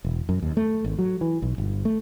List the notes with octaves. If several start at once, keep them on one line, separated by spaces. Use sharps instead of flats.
E1
F#2
D#2
A3
G#1
F#3
E3
B1
G1
A3